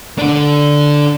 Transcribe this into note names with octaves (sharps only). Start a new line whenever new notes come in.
D3 D4